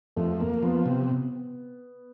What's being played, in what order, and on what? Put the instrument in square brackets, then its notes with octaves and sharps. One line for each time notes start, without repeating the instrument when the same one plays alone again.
[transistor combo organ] F2 [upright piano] A3
[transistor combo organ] A#3
[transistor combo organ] F3 [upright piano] B3
[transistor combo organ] C3